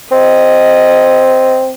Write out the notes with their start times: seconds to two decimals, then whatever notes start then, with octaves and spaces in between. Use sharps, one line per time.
0.12 C4 D#5